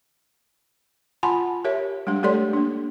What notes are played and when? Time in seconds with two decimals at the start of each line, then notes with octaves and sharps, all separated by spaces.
1.23 F4 F#5 G#5 A5 B5 C6
1.65 G4 A#4 C#5 E5
2.07 G3 G#3 D4 G4
2.23 A3 G4 A4 C#5 D5 C6
2.53 A#3 D4